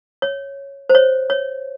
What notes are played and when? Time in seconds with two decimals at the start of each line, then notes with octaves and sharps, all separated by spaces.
0.22 C#5
0.89 C5
0.95 C#5
1.30 C#5